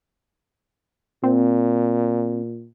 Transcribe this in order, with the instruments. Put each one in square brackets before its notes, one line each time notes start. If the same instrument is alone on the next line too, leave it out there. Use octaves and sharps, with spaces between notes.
[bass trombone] A#2 [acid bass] C4